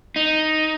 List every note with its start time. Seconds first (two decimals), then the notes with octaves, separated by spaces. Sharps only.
0.16 D#4